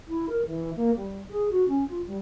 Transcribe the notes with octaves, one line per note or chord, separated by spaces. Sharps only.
E4
A#4
E3
A#3
G3
G#4
F#4
C#4
F4
G3